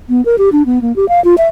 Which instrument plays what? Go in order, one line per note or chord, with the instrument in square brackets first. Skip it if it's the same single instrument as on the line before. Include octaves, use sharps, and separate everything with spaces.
[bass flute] B3
A#4
G4
D4
B3
A#3
G4
F5
F4
E5